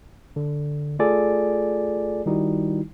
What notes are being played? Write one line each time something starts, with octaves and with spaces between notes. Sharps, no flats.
D3
A3 F4 G#4 A4 D5 G#5
D#3 G3 D#4 E4 F#4